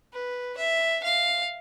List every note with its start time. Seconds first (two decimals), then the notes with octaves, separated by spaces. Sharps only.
0.13 B4
0.57 E5
1.03 F5